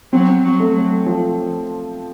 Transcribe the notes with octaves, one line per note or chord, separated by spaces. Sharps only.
F#3 C4
F#3
A3
F#3
F3